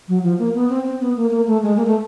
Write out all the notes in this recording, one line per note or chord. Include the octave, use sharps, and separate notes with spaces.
F#3
F3
A#3
B3
C4
C4
B3
A#3
A#3
A3
G#3
A#3
A3